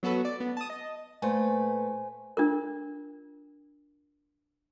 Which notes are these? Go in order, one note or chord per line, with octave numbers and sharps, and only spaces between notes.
F#3 B3 F#4 A4 B4
D5
B3
A5 D#6
D#5
A#2 A3 B4 C5 G#5
D4 F4 A#4